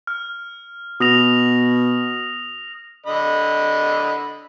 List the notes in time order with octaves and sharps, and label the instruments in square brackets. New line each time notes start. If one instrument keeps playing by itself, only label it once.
[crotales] F6
[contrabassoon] B2 [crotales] D#6 A#6 F7
[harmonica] D3 D#5 B5